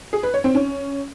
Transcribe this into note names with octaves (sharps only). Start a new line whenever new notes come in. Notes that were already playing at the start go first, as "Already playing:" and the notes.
G#4
B4
C#5
C4
C#4